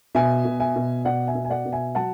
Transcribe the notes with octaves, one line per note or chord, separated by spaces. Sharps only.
B2 E5 G#5
B2
E5 G#5
B2
B2 D5 F#5
E5 G#5
B2
G#5
D5 F#5
B2
E5 G#5
F#3 F#5 A5